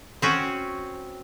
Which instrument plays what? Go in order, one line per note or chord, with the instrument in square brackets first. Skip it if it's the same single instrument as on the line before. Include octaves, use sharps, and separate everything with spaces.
[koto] C4 C#4 F#4